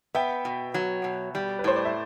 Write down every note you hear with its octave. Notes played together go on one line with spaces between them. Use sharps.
B3 E5 G5
B2
F#3
B2
G3
B4
A2 C5
D5
E5